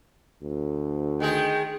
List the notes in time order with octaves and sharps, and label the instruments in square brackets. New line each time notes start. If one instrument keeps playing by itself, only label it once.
[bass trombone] D2
[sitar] D#3 G#3 G#4 [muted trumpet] G5